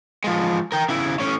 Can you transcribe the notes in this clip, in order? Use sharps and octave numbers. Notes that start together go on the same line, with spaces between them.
F3 G#3
A#4 G5
C#3 E4
A2 C#4